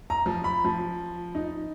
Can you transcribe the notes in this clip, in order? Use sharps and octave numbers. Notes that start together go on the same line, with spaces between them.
A#5
F3
B5
F3
D#4